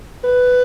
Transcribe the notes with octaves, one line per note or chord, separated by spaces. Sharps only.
B4